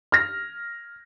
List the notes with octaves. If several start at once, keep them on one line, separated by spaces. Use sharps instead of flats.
F6 A#6